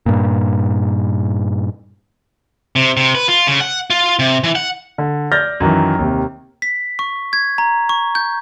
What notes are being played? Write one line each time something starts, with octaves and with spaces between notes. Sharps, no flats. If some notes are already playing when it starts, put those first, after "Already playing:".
G2 A#2
C3
C3
B4
F4
C#3
F#5
F4
C3
E3
F#5
D3
D5 F6 G6 A6 A#6
F#2 D#3 E3
D#2 C3
B6
C#6
G#6
A#5
C#6
G6